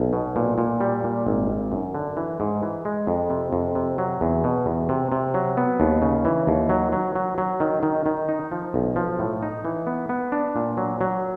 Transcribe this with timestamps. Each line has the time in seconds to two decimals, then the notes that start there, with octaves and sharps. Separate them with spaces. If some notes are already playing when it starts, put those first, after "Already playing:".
Already playing: B1
0.13 B2
0.36 A#2
0.58 A#2
0.81 G3
1.04 A#2
1.27 G#1
1.50 G#1
1.72 F#2
1.95 D3
2.17 E3
2.40 G#2
2.63 E3
2.85 G#3
3.07 F2
3.30 C3
3.53 F2
3.75 C3
3.98 F#3
4.21 E2
4.44 B2
4.66 E2
4.89 C3
5.12 C3
5.34 F#3
5.57 B3
5.80 D#2
6.02 C#3
6.25 E3
6.47 D#2
6.69 F#3
6.92 F#3
7.16 F#3
7.38 F#3
7.60 D#3
7.83 D#3
8.06 D#3
8.29 D#4
8.52 F3
8.74 B1
8.96 F3
9.19 A2
9.43 D#4
9.65 E3
9.87 B3
10.09 B3
10.32 D4
10.56 A#2
10.77 F#3
11.01 F#3